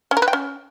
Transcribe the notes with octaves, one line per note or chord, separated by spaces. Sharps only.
C#4
A#4
B4
G5
C#4